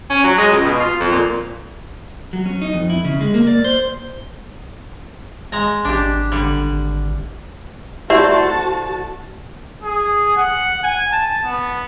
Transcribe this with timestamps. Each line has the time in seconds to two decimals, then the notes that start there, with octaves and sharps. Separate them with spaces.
0.10 C#4
0.24 F#3
0.38 G#3
0.52 C#2
0.65 B2
0.80 F4
1.00 F2
1.12 A#2
2.33 F#3
2.46 C#4
2.62 D#4
2.73 F2
2.90 E4
3.05 C#3
3.21 G#3
3.34 A#3
3.47 D5
3.64 C5
5.52 G#3 A#5
5.85 G#1 D4 G4
6.32 D3 G3
8.10 A3 E4 F#4 G4 C5 D5 A5
9.84 G#4
10.36 F#5
10.83 G#5
11.12 A5
11.45 B3